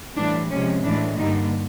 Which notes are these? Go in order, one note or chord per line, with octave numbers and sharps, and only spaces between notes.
A2 E3 G3 D4
C3 F3 G#3 C#4
A2 E3 G#3 D4
G2 D3 G3 A#3 D#4